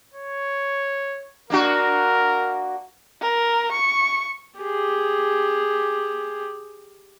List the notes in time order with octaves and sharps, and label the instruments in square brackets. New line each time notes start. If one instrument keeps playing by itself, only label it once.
[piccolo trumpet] C#5
[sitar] A#3 D4 F#4 [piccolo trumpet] A#4
[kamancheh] A#4
C#6
[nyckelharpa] G4 G#4